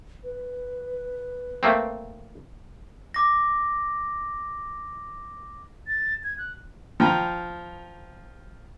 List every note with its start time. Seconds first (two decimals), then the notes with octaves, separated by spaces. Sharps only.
0.24 B4
1.63 A3 A#3 C4
3.14 D6 A#6
5.87 A6
6.24 G#6
6.38 F#6
7.00 F3 G5 A#5 B5